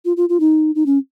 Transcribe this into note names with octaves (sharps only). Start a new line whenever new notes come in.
F4
F4
F4
D#4
D#4
C#4